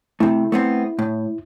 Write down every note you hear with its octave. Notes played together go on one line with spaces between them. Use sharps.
C3 A3 E4
A3 B3 C4
A2